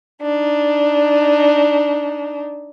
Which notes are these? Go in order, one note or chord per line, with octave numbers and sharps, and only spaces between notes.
D4 D#4